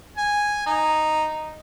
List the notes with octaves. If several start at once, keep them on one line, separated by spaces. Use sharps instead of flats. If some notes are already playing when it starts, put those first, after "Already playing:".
G#5
D#4